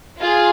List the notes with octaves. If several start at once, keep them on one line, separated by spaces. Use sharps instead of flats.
F4 G#4